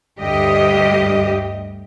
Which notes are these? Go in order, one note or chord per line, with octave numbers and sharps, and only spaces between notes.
D2 G2 G4 D#5